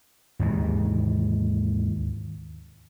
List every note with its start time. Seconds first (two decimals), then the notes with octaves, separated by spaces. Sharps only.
0.39 D#2 G#2 D#3 E3